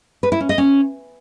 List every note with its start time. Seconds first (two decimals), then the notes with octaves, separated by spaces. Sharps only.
0.23 B4
0.32 E4
0.41 C#4
0.49 D#5
0.58 C#4